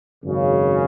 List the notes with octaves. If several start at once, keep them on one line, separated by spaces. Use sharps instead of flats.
G#1 F#2 C#3